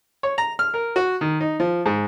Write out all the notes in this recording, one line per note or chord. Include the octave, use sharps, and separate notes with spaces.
C#5
A#5
F6
A#4
F#4
D#3
D#4
F3
G#2